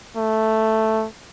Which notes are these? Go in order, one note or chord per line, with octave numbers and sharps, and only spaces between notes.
A3